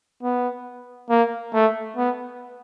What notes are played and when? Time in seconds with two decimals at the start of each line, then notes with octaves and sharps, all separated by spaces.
0.23 B3
1.10 A#3
1.54 A3
1.97 B3